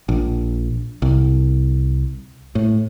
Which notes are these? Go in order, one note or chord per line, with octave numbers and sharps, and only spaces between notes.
A#1
C2
A2